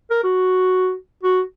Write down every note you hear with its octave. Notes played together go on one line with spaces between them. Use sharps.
A#4
F#4
F#4